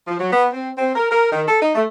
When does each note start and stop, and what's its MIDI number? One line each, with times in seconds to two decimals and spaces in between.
0.08 0.18 53
0.20 0.31 54
0.33 0.47 59
0.53 0.71 60
0.78 0.95 60
0.96 1.08 70
1.11 1.30 70
1.32 1.43 51
1.48 1.61 69
1.62 1.72 63
1.75 1.83 57